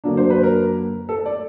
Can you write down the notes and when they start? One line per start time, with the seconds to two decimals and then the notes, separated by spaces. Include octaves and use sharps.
0.04 F#2 D3 F#3 A#3 D4
0.17 C5
0.30 B4
0.43 A#4
1.09 A4
1.26 D5